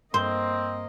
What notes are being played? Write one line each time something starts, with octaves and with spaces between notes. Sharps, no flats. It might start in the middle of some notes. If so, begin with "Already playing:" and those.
G2 A#3 C4 C5 D#5 C6